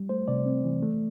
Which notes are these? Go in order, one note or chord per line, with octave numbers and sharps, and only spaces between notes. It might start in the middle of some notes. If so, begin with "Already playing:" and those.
Already playing: G3
A3 C5
C3 D5
C4
E3
A3